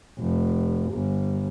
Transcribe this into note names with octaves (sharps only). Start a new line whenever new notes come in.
F1
G1